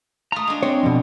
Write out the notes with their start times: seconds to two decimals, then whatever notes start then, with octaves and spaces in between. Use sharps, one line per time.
0.32 A3 F4 A#5 D#6
0.47 G#3 D4
0.63 G#3 C4 C#5 G5
0.83 F2 B2